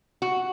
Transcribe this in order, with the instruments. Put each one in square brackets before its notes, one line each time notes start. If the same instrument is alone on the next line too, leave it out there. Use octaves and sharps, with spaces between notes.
[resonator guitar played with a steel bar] F#4